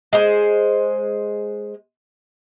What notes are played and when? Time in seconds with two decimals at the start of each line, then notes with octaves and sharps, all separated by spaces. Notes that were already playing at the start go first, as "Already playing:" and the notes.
0.13 G#3 C5